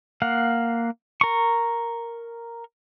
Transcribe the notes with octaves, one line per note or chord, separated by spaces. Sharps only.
A#3 F5 F#5
A#4 C#6